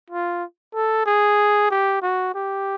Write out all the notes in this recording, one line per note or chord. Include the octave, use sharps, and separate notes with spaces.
F4
A4
G#4
G4
F#4
G4